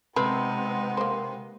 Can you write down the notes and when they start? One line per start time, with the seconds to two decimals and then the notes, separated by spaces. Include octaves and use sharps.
0.16 C3 G#3 B3 D#4 B4
0.97 A#3 C5